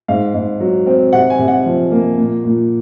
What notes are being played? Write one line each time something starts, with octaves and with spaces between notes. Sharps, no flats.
G#2 F5
G#2
F#3
C4
C3 F#5
G#5
C3
F#5
F3
A#3
A#2
A#2